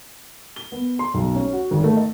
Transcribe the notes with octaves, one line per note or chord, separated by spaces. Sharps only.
G7
B3
C6
B1
C#4
F#4
G#1
A3
D#5